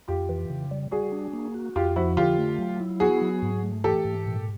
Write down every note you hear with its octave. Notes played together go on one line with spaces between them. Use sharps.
F2 F4 G4
E3
C#3
G3
G3 F#4 G#4
D4
A#3
F#4
F2 F4 G4
F3 E4 F#4
D3 F4 G4
A3
F#3
E4
B3 F#4 G#4
F#3
G#2
A3
E3 G4 A4
G#2
A#2